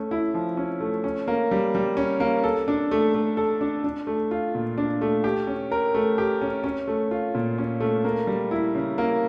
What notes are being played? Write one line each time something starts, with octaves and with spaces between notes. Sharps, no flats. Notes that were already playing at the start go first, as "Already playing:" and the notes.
Already playing: A3 C#4
E4
F3
C#4
A3
C#4
A#3
G3
G3
C#4
A#3
A4
D4
A3
A3
A4
D4
D4
A3
F4
A#2
D4
A3
G4
C#4
A#4
A3
G4
C#4
C#4
A3
F4
A#2
C#4
A3
A#3
G3
E4
C#3
A#3